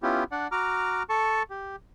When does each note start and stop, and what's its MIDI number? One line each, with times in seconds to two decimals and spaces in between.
0.03 0.24 59
0.03 0.24 61
0.03 0.24 64
0.03 0.24 65
0.03 0.24 67
0.32 0.48 62
0.32 0.48 74
0.32 0.48 78
0.52 1.03 66
0.52 1.03 82
0.52 1.03 86
0.52 1.03 89
1.09 1.43 69
1.09 1.43 81
1.09 1.43 85
1.50 1.76 67